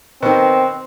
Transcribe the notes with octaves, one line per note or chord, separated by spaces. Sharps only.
B2 D#3 C4